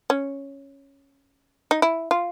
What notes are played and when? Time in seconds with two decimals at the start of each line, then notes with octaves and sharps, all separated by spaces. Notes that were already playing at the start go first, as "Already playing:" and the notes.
0.10 C#4
1.71 D#4
1.82 E4
2.11 F4